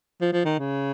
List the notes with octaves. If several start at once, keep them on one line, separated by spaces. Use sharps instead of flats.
F3
F3
D#3
C#3